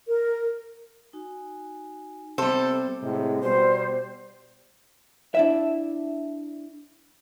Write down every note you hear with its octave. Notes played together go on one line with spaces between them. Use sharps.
A#4
D#4 F#4 G#5
C3 G3 B3 A4 C5
A2 C3 G#3
B2 G3 C5
D4 E4 E5